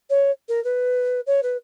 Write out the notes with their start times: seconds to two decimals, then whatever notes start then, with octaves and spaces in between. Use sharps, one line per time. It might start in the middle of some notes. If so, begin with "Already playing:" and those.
0.10 C#5
0.48 A#4
0.64 B4
1.26 C#5
1.43 B4